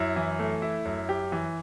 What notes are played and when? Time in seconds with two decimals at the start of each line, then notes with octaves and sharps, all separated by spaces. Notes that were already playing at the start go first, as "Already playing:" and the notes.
Already playing: F#2 E4
0.16 E3
0.39 A3
0.62 E4
0.85 F#2
1.09 G4
1.32 E3